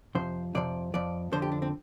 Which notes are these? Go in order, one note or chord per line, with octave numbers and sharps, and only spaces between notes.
F2 C3 F3 C5
F2 C3 F3 D5
F2 F3 D5
F2 D3 F3 C5
G4
D4
C4